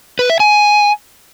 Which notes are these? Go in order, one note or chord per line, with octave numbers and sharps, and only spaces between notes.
B4
E5
G#5